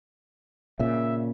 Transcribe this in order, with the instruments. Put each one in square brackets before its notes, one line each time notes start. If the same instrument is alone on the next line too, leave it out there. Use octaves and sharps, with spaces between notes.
[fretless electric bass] A#2 C#3 [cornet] E5